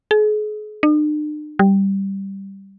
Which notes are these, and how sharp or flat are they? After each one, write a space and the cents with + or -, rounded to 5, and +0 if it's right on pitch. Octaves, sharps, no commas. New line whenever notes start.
G#4 +40
D4 +45
G3 -5